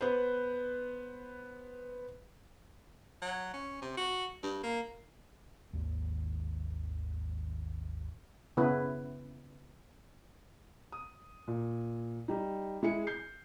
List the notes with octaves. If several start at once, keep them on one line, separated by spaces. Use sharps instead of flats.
B3 B4 C5
F#3
C#4
C3
F#4
G2
A#3
G#1 D#2
C#3 B3 E4 B4
D#6
A#2
G3 D#4
G#3 E4 G#4 C#7
G6 C7